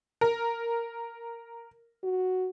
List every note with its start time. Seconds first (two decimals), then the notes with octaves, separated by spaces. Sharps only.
0.21 A#4
2.04 F#4